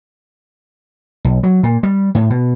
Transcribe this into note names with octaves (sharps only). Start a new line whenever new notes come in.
B1
F#3
A#2
G3
A2
B2